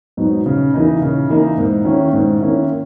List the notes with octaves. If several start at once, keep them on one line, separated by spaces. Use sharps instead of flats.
G#2 F#3 B3 D#4
C#3
E3 A#3 D#4
C#3
E3 A#3 D#4
G#2
D#3 A#3 C#4 E4
G#2
D#3 A#3 C#4 E4